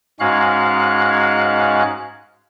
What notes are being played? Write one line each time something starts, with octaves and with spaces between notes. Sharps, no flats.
G#2 G#3 C#4 F#4 F5 F#6